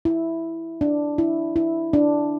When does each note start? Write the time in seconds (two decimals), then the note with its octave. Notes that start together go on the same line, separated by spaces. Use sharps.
0.05 E4
0.81 D4
1.18 E4
1.56 E4
1.93 D4